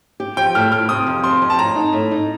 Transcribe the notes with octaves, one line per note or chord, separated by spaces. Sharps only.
G4
F3 G5
A2 F6
A2 F6
C3 D#6
F2
F2 C6
F2
A5
A2 A#5
D#4
A2
D#4